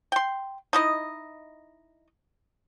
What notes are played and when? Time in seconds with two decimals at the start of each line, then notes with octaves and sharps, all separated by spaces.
0.12 G5 C6
0.73 D#4 E4 D#5